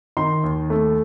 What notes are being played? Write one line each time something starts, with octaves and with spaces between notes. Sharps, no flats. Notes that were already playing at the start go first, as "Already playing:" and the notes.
D#3 C6
D#2
A3